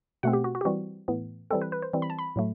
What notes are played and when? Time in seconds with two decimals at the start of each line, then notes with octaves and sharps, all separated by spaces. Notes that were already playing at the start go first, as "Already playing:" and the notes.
0.23 B2 A3 C4 F#5
0.33 G4
0.44 F#4
0.55 F#4
0.61 G4
0.65 E3 G3 C4 F#4
1.08 A2 E3 B3
1.51 E3 G3 C4 A4
1.61 B4
1.72 B4
1.82 C5
1.93 E3 G3 C4
2.02 B5
2.10 A5
2.19 B5
2.36 A2 F#3 A3